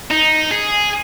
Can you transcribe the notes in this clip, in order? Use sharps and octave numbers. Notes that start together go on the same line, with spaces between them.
D#4
G#4